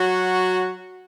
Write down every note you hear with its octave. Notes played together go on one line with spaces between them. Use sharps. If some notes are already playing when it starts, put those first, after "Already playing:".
Already playing: F#3 F#4